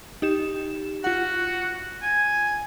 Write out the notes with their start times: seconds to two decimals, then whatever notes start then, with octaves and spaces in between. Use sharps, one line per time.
0.22 D#4 G4 E7
1.04 F4 F#4 F#5
2.02 G#5